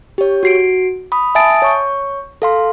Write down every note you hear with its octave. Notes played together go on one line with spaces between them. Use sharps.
G4 C#5
F#4 C7 D7
B5 D#6
E5 G#5 A5 D#6 A6 D7
C#5 C#6
A4 F5 C6